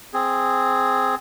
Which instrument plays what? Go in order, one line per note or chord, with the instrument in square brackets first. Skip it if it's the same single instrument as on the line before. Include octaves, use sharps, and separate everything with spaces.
[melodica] C4 G#4